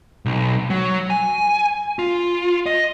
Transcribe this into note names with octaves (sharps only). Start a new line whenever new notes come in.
B1
F#3
G#5
F4
D#5